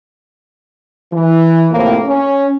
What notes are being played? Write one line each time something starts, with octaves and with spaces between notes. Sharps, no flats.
E3
A2 C3 F3 A#3
C#4